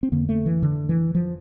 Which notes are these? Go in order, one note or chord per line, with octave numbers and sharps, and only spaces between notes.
C4
F2 D3 A#3
A3
E3
D3
E3
F3